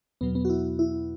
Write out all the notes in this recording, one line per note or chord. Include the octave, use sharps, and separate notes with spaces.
E2 B2 F#3 B3
B3
F#4
E4
E4